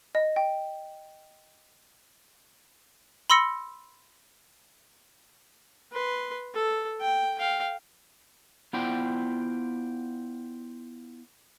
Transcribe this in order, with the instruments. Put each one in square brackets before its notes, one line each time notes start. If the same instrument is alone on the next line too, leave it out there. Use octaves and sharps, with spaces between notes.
[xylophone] D#5
G5
B5 C6 E6 A#6 C#7
[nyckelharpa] B4 C6
A4
G5
F5 G5
[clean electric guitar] B3 E4 F4 C5 D5 G5